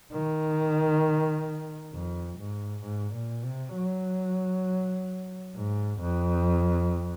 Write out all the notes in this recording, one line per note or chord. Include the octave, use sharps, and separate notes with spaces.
D#3
F2
G#2
G#2
A#2
C3
F#3
G#2
F2